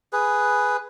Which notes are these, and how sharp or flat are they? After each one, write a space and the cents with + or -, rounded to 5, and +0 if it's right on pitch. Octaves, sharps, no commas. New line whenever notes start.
G#4 +0 B4 +0